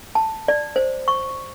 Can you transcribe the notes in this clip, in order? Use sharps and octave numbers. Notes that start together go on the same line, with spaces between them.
A5
D5
C5
C#6